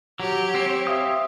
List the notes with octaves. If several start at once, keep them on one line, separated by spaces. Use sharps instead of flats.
F#3 G4 C#5
C4
E5 F5 D#6